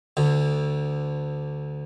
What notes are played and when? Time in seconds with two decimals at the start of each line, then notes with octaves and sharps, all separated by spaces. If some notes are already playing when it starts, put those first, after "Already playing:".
0.17 D2 D3